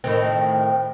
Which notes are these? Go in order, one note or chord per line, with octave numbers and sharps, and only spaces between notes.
A2 D#3 C4